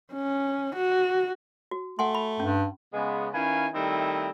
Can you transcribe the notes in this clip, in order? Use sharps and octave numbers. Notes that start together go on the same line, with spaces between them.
C#4
F#4
F#4
A3 F#5 G#5 C6
B5
G2 C#4
C#3 G#3 B3
D#3 C#4 E4 B4 F5 G#5
D#3 G3 A3 C4 D#4 E4